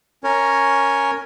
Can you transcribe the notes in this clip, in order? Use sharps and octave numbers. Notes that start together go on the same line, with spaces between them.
C#4 A#4 C#5